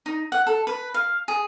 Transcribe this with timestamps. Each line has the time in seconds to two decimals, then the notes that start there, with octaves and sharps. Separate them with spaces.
0.06 D#4
0.32 F#5
0.47 A4
0.67 B4
0.94 F5
1.28 G#4